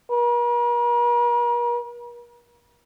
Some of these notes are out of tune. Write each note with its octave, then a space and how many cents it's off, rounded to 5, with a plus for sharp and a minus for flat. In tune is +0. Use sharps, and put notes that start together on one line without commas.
A#4 +45